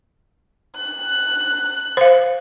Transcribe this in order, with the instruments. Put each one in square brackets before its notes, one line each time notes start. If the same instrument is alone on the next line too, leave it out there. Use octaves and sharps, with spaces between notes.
[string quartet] F#6
[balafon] C5 F5